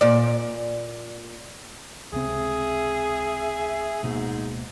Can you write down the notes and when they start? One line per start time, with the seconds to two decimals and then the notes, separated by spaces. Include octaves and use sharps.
0.01 A#2 D5
2.13 C#2 C3 C4 G#4 E5
4.03 D1 G#2 B2 A#3